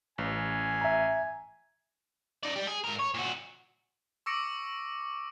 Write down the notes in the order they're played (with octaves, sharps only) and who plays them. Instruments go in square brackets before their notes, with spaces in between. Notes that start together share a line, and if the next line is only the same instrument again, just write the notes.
[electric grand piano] A1 [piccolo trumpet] G#5
[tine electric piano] E5 A#5
[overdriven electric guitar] D#4 D5
G3
G#4
G#2 A#4
C#5
A#2 F#4
[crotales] C#6 D6 E6 A#6 C#7 D7